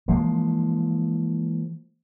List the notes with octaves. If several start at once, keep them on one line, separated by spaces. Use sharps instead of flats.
E3 F3 G#3 A#3